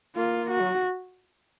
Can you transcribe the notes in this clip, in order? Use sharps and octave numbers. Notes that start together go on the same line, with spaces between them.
A#3 F4
F#4
F#3